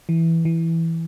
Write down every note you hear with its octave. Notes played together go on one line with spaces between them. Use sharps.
E3
E3